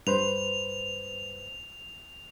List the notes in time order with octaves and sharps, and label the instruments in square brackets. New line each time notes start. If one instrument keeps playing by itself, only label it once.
[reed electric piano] G2 B4 C5 [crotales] F7